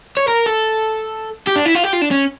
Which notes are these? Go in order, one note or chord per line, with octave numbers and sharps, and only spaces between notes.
C#5
A#4
A4
G4
D4
E4
F4
G4
F4
D4
C#4